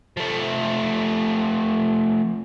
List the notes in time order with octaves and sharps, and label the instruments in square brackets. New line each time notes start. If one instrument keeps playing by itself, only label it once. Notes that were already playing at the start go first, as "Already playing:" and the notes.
[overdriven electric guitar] F3 A3